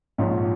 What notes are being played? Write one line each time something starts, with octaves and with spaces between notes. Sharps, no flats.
A#1 G#2 F3 C#5 D#5